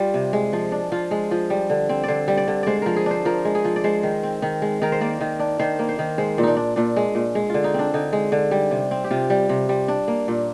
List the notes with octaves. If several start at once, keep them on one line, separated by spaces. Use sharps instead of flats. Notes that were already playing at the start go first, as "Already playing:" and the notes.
Already playing: G3 F4
C3
G#3
F3
D4
F3 F4
G#3
F3
G3
D3
C4
D3 C5 D5
G3
D5
D3
G#3 C5 D5
F3 A#4
G#4
D4 C5
F3 A#4
G#3
G#4
F3
D5
G#3 C5
D#3
C4
D#3
G#3
D#3 A#4
C5
A#3 D5
D#3
D4
D#3 C5
A#3
C5
D#3
G#3 C5
A#2
D4 D#4
D4
A#2 D4
G#3
A#2
G#3
D3 F4
D#4
C4 D4
D3 D#4
G#3
D3
G3
C3
C4
G4
C3 F4
G3
C3
G3
D4
A#3
A#2